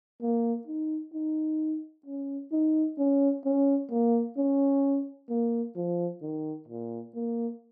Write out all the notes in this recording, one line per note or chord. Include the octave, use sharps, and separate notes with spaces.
A#3
D#4
D#4
C#4
D#4
C#4
C#4
A#3
C#4
A#3
F3
D#3
A#2
A#3